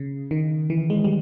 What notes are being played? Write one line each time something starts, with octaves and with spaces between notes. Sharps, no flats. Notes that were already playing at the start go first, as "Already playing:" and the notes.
Already playing: C#3
D#3
E3
G#3
G3